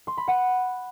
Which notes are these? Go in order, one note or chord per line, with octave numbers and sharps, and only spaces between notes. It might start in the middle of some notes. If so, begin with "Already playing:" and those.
C6
B5
F#5